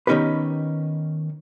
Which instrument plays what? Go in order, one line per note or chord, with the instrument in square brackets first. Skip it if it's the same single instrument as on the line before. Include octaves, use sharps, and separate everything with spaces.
[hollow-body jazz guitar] D#3 B3 C#4 D#4 G4 B4